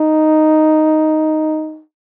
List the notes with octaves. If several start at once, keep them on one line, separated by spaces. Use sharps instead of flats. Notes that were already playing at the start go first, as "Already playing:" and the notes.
Already playing: D#4